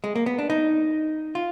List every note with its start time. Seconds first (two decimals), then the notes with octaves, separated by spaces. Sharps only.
0.04 G#3
0.16 A#3
0.26 B3
0.39 D4
0.50 D#4
1.35 F4